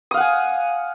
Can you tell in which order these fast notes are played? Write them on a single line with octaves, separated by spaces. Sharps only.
D#6 F5 F#5 G#5